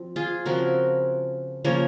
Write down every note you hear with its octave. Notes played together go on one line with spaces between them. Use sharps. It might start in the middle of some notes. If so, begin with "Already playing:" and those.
Already playing: F3 C4
F4 G#4
C#3 F3 C4 F#4 A#4
C#3 F3 A#3 A#4 C#5